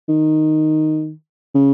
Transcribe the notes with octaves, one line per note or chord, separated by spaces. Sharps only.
D#3
C#3